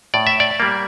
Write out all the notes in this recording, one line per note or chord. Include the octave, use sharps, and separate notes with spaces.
A2 D5
E5
D5
G3 A#3